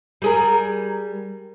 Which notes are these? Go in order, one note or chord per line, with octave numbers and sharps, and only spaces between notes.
G3 G#4 A#4